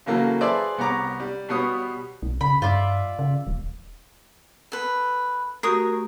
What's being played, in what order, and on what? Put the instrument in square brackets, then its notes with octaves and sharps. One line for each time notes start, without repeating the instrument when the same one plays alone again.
[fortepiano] C#3 E3 F#3 A#3 A4
G#4 B4 C5 D5 E5 A5
C2 B3 G4 C#5 A#5 D6
G3
B2 G3 B3 C#5 D#6
[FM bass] B1
[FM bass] C#3 [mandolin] B5
[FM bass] G2 [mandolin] F4 D5 E5
[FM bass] C#3
D#1
[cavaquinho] A4 B4
[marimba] A3 F#4 G4 [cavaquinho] A#4 C#5 D#6